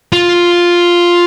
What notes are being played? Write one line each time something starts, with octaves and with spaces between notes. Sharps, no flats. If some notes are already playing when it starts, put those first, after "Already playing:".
F4